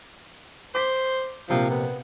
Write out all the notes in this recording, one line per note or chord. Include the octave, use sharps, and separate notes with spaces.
C5 D6 B6
A#1 C3 F3 A#3
B3